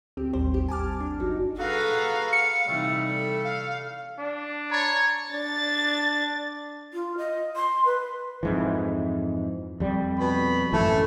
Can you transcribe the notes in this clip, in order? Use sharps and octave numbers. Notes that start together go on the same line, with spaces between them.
D2 C4 G4
A1 D#2 G3 C5
G#1 G4
G#5 A5 D6 F6
D4
G1 F#3 D#4 F#4
F#4 G#4 A4 B4 F5 F#5 A#5
C#7
C3 E3 G3 A3 D#4
A4
F5
D4
C#5 A#5 B5 A6
D4 A6
F4
D#5
C6
B4
F2 G#2 E3
F2 G3
B2 B5
A1 F#2 E3 A3 A4